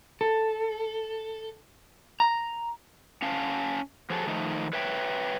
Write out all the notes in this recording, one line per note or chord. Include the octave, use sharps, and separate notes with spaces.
A4
A#5
C#4 F5 A5
F3 F#3 G#4 A4
D#3 F3 A3 D#4
B4 C#5 E5 G5